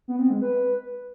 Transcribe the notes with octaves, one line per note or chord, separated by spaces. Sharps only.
B3
C4
G#3
B4